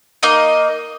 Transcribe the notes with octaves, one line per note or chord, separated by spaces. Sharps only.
A#3 D#4 D#5